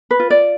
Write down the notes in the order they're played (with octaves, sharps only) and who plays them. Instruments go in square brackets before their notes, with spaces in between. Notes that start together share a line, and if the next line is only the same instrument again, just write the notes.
[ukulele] B4
F4
D5